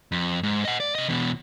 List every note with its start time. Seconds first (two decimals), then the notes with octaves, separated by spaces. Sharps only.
0.12 F2
0.43 G#2
0.65 D#5 F#5
0.80 D5
0.95 C3 D#5
1.09 E2 B2